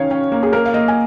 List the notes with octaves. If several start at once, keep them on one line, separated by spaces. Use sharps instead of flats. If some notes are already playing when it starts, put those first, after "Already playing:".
Already playing: D#3 C#4 C#5 F5
C#4
A#3
G#4
A#3 A#4
F5
A#3 D#5
G#5